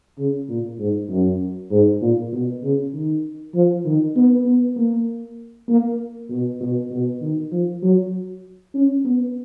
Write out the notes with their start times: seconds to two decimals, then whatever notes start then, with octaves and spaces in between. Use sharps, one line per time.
0.18 C#3
0.49 A#2
0.79 G#2
1.10 F#2
1.71 G#2
2.02 A#2
2.32 B2
2.63 C#3
2.93 D#3
3.55 F3
3.85 D#3
4.16 B3
4.46 B3
4.77 A#3
5.69 A#3
6.30 B2
6.60 B2
6.91 B2
7.21 D#3
7.52 F3
7.83 F#3
8.74 C#4
9.05 B3